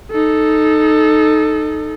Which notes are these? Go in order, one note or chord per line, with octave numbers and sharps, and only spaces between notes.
D#4 A4